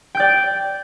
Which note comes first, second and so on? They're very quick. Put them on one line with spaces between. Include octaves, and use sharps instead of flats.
G5 G6 D5